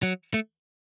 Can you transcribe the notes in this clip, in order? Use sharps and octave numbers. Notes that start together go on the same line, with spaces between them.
F#3
A3